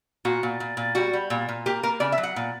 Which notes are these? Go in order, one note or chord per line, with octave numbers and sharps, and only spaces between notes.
A#2 F#4
A#2
A#2
A#2
G3 F#4
G3
A#2
A#2
A#3 G4
A#3 A#4
C#3 D5
E5
F#3
F#5
A#2